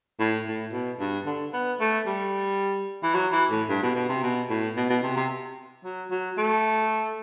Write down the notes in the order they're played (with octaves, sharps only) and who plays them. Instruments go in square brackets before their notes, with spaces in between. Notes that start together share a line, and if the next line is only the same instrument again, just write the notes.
[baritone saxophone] A2
A2
B2
G2
D3
B3
A3
G3
E3
F#3
E3
A2
G2
B2
B2
C3
B2
A2
B2
B2
C3
C3
F#3
F#3
A3